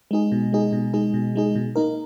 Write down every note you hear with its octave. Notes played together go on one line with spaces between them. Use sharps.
G#3 D#4 G#4
B2
G#3 D#4 G#4
B2
G#3 D#4 G#4
B2
G#3 D#4 G#4
B2
A#3 D#4 A#4